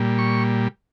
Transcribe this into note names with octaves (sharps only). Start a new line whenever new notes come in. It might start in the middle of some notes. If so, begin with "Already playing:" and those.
Already playing: A#2 G3
C#6